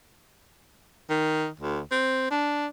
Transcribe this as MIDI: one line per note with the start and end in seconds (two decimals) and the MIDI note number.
1.10 1.48 51
1.59 1.81 38
1.92 2.30 60
2.31 2.67 62